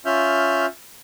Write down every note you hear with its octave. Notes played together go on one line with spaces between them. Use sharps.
C#4 F4 E5 F6 G6